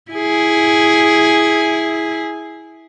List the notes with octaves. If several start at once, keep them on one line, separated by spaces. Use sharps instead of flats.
E4 G#4